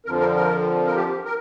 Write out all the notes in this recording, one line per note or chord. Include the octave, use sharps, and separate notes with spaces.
F2 D3 F3 A#4
A#4
A#4
A#4
G4
A#4